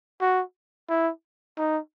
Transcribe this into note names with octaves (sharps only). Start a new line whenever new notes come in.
F#4
E4
D#4